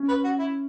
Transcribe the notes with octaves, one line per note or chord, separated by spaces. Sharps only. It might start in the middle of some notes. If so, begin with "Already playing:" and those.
Already playing: C#4
B4
F#4
E4